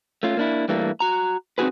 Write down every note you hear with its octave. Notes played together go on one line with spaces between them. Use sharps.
A3 C#4 F4
A#3 D4 E4
G2 E3 G3 A3 A#3
F#4 A#5
C4 D#4 E4 F#4 G#4 B4